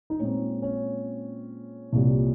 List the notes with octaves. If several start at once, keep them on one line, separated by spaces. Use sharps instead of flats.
D#4
A#2 G#3 C4 C#4
C#4
C2 A#2 G3